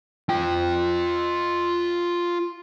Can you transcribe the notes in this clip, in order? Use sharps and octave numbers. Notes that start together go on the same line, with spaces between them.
F4 G5